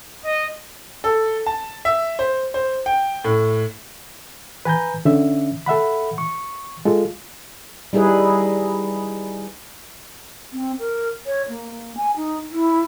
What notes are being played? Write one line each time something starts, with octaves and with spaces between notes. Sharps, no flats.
D#5
A4
A5
E5
C5
C5
G5
A2
B4 G#5 A#5 G6
D3 C#4 E5
A4 E5 F#5 B5
C#6
G#3 F4 A4
G3 D#4 E4 G#4 B4
C4
A#4
C#5
A#3
G#5
D#4
E4